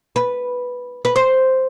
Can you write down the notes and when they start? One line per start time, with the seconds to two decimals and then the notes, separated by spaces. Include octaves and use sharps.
0.16 B4
1.05 B4
1.16 C5